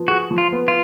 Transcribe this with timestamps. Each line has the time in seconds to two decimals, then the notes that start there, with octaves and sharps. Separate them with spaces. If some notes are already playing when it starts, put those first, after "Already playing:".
Already playing: F3 B3
0.08 F#4 G#4
0.31 F3
0.38 F4
0.52 B3
0.68 F4